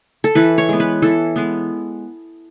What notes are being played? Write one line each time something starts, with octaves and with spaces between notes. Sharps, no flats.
A4
E3 B4
C#5
G#3 B3
B4
E3 A4
G#3 B3